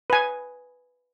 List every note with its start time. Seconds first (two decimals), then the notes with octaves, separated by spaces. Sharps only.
0.10 B4 G#5